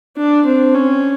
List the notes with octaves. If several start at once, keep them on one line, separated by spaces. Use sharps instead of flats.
D4
C4
C#4